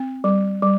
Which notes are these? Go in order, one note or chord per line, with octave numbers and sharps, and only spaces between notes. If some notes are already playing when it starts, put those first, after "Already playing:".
Already playing: C4
G3
G3